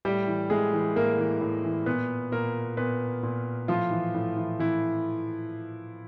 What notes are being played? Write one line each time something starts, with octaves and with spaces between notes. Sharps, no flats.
A2 G3 G4
E3
A2 G#3 G#4
E3
A2 A#3 A#4
E3
A2
E3
A#2 B3 B4
A#2 A#3 A#4
A#2 B3 B4
A#2
A2 F3 F4
E3
A2
E3
A2 E3 E4